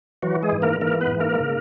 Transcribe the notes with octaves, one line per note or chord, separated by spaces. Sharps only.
E3 F#3 F#4
G#3 G#4
G#2
A#3 A#4
E3 A#3 A#4
B3 B4
G#2
A#3 A#4
C#3